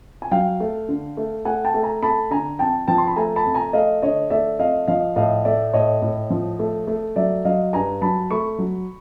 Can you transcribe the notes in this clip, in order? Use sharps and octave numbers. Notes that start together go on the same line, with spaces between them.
G#5
F#3 F5 G5
A3
D3
A3
A3 F#5 G#5
G5 A5
A3
G#5 A#5
A3 A5 B5
D3 G#5 A#5
F2 G5 A5
F3 G5 A5
C6
B5
A3 G#5 A#5
A5 B5
F2
G#5 A#5
A3 D#5 F5
D3 C#5 D#5
A3 D5 E5
F2 D#5 F5
F3 D#5 F5
A2 D#5 F5
A3 D5 E5
A2 C#5 D#5
A2
F3
A3
A3
F#3 D5 E5
F#3 D#5 F5
G2 G#5 A#5
F#3 A5 B5
A3 B5 C#6
F#3